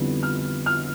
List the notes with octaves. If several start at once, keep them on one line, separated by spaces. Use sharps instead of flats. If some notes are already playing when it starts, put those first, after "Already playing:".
Already playing: F2 D3 G3 B3 E4
F6
F6